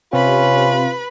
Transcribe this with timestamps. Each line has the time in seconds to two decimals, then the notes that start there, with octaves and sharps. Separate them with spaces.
0.13 C3 C#4 F4 B4 B5